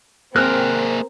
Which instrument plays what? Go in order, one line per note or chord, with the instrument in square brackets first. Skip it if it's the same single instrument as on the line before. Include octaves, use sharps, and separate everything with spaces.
[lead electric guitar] A#3 G#4 [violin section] C4 [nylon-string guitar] A#4 [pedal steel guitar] F6 F#6